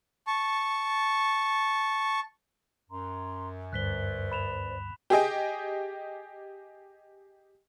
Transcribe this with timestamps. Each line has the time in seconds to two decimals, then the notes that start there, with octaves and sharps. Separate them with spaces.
0.27 A5 C#6
2.90 F#2 A#5 C6
3.73 D2 G2 B4 C5 D5 F#6 B6 G7
4.32 B5 E7 F7
5.10 G4 G#4 D#5 G5